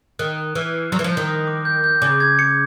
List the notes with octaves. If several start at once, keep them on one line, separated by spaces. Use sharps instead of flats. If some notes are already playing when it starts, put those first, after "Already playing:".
D#3 F#6
F#6
E3 F6
C7
F#3 C6
E3
F3
G6
D#3
A#6
D6
G6
G6
C#3 D6
G#6
C#7